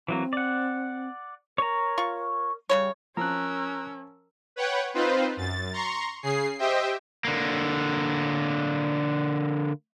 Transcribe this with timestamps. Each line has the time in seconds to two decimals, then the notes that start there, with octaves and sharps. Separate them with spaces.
0.08 E3 F#3 A#3 C4
0.33 D5 F#5
1.58 A#4 C#5 A#5
1.98 F4 C#6
2.69 C#3 G3 A#3 C#5
3.17 F3 C#4 A#4 A#5 E6 F#6
4.56 B4 C#5 F#5 G5
4.94 C4 D#4 F4 B4 C5
5.37 F#2 A6
5.73 A#5 C6 C#6
6.23 C#3 G#4 C7
6.59 G4 C5 D#5 E5 G5
7.25 D3 A#3